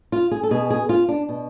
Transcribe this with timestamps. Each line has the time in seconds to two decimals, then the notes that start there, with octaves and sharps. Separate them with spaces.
0.12 F4
0.31 G#4
0.43 A4
0.51 B2 G#4
0.70 G#4
0.89 F4
1.08 D4
1.29 B2